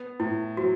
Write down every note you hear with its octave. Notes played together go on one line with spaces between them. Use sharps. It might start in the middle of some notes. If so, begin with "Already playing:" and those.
Already playing: B3
A2 E4
F#3 F#4